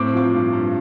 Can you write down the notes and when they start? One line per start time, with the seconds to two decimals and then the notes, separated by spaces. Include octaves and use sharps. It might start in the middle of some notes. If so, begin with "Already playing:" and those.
Already playing: A2 C4 D6
0.14 F3 D6
0.34 G2
0.53 G2